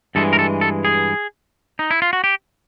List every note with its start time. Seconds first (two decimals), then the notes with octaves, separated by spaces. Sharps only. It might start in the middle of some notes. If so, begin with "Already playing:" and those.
0.15 G2 E3 G#3 A4
0.33 A#4
0.39 A4
0.61 A4
0.85 G#4
1.79 D#4
1.91 E4
2.02 F4
2.13 F#4
2.24 G4